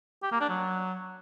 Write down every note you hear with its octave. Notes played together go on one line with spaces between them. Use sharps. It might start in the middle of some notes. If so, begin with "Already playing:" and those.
G4
A#3
D4
F#3